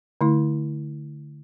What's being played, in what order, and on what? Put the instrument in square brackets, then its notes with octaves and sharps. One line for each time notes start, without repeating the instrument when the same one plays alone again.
[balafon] D3 A3 E4